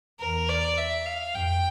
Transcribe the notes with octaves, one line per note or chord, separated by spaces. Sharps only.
E2 A#4
D5
E5
F5
F2 G5